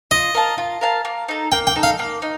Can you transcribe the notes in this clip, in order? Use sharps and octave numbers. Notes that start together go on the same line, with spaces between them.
F4 D#5
A#4 F5 A5
F4
A#4 F5 A5
A#3
D#4 A4
A#3 G5
G5
D#4 A4
F5
A#3
D#4